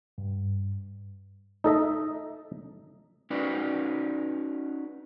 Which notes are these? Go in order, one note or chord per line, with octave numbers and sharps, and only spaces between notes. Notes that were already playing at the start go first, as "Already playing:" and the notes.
G2
D#4 A4 D#5 E5
C#4 D#4 F#4 B4 D5